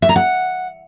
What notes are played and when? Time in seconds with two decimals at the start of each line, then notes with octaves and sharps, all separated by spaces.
0.02 E5
0.09 A#5
0.16 F#5